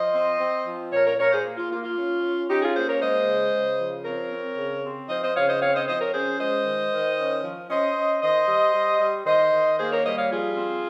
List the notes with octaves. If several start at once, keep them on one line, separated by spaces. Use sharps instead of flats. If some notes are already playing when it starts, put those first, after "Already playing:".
Already playing: F3 C5 D#5
C4
C4
F3
A#2 A#4 C#5
A#4 C#5
A#2 A#4 C#5
G#4 C5
A#3
F4
A#3 F4
F4
C#4
C#4
C#4 D#4 G4
F4 G#4
A#3 G#4 C5
A#4 C#5
G#3 C5 D#5
C#3
C#3
F3
C4 A#4 C#5
C4
C#3
C4
F3 C5 D#5
C5 D#5
C#3 C#5 F5
C5 D#5
C4 C#5 F5
C5 D#5
F3 C5 D#5
A#4 C#5
C#4 G#4 C5
G#3 C5 D#5
D#3
D#3
C#4
F3
C#4 C5 D#5
C#4
D#3 C5 D#5
G3
G3
G3
D#3 C5 D#5
D#3
A#3 G#4 C5
A#4 C#5
G3 C5 D#5
C#5 F5
F3 F4 G#4
C4